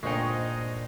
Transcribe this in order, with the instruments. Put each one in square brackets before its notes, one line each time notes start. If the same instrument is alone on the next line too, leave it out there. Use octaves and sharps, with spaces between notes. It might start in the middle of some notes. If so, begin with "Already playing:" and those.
[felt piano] G2 A#2 [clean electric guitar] G#3 D#4 [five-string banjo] F#4 C5 G5 [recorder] D#5